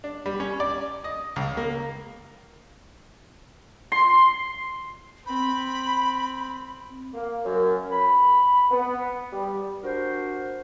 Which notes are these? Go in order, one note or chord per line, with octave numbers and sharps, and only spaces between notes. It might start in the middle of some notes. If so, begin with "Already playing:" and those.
D4
G3
C#4
D5
D#5
C#2
A#3
C6
C4 B5
A#3
F#2
B5
B3
G3
D4 F#4 A#4 C5